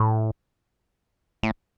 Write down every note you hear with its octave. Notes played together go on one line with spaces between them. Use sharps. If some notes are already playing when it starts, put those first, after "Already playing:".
Already playing: A2
A2